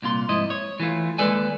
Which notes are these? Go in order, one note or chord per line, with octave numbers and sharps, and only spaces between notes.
C2 A#2 F4 C6
F2 G#2 E4 D#5
C#5
E3 A3 F4
D#2 G#3 A4 B4 D5 G#5